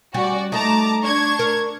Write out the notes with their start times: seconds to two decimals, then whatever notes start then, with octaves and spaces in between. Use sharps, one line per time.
0.14 G3 C#4 F#4 D5
0.52 A3 D#4 A5 A#5 D6
1.02 D4 C#6 G#6
1.39 A#4